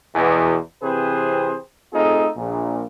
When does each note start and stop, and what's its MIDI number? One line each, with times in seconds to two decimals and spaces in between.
0.15 0.57 40
0.15 0.57 47
0.83 1.56 48
0.83 1.56 52
0.83 1.56 60
0.83 1.56 68
0.83 1.56 71
0.83 1.56 72
1.94 2.28 57
1.94 2.28 60
1.94 2.28 63
1.94 2.28 65
1.94 2.28 68
1.94 2.28 69
2.37 2.84 34
2.37 2.84 46